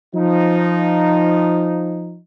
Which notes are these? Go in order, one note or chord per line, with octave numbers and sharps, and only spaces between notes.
F3 D#4